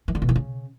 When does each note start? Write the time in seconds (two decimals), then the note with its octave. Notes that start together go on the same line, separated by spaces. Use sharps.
0.08 E3
0.15 D3
0.22 B2
0.29 D#3
0.36 C#3